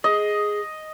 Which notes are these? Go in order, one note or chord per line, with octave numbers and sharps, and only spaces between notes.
G#4 D#5